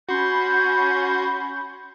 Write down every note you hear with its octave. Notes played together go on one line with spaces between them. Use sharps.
C#4 F#4 B5 C6 G6